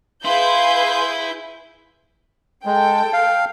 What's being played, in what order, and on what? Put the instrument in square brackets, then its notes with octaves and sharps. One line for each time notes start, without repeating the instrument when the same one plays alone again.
[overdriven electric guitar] E4 [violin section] G#4 B4 G6 [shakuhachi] F5 [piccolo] C6
[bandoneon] G#3 [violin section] A4 G5
[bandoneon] F5